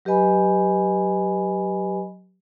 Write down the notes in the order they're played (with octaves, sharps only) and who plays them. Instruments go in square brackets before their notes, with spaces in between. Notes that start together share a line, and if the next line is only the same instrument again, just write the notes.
[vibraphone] F#3 G4 B4 D#5 G#5 B5